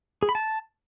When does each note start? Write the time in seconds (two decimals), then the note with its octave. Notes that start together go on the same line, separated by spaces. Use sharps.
0.23 G#4
0.29 B5
0.35 A5